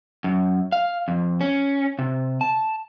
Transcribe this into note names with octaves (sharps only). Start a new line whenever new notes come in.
F#2
F5
F2
C#4
C3
A5